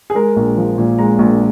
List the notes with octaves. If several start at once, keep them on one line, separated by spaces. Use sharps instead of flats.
G#4
G#3 A#4
A#1
F3
A#2
G#3 A#5
A#1